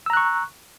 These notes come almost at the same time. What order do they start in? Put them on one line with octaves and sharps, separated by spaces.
E6 A#5 F#6 C#6